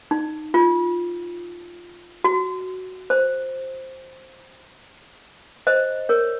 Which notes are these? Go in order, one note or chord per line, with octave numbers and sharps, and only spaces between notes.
D#4
F4
F#4
C5
C5 D#5
A#4 C#5